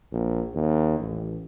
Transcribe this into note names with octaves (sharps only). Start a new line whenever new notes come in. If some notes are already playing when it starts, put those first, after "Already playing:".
A#1
D#2
A1